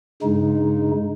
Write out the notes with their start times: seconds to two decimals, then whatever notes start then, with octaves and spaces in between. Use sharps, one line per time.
0.23 G2 C#3 G#3 D#4